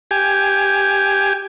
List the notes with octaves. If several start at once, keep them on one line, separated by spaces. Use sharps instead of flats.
G4 G#5